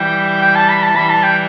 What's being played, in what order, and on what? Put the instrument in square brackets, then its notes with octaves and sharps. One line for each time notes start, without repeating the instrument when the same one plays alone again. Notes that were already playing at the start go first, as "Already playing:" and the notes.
Already playing: [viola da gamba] E3 G3 [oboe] G5
[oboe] G5
A5
B5
A5
[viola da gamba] E3 G3 [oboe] B5
[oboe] A5
G5